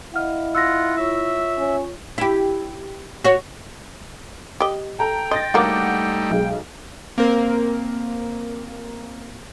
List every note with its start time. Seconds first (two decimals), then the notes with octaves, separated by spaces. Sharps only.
0.14 E4 D#5 F5 F#5 F6
0.55 F4 F#5 E6 A#6
0.97 F4 C#5 E5 C#6
1.58 C#4
2.18 E4 G4
3.24 F#4 C#5
4.60 G4 D#5
4.99 A4 G5 A#5
5.31 D#5 C6 A6 A#6
5.54 D3 F#3 G3 A3 A#3 D#4 F#5 D6
6.30 B1 G#3
7.18 A#3 C4 A#4